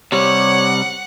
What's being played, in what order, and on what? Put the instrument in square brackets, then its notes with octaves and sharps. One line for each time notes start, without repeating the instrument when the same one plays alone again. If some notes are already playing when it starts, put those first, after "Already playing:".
[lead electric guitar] C3 G3 [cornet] C#5 [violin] F#5